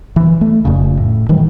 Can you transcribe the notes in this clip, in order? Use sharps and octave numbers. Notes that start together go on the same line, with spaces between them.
E3
A3
F1 F2 C#3
A2
D#3 E3 F#3 G3